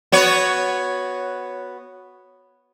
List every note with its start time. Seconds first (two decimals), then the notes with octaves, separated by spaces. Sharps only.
0.12 B3 F#4 C#5